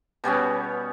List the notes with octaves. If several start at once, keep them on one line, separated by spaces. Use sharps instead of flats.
B2 G3 B3 C#4